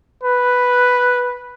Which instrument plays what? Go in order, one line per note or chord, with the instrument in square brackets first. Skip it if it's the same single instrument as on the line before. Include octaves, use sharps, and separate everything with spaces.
[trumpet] B4